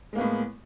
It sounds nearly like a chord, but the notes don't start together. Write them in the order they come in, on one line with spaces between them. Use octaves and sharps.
G#3 A#3 B3 A2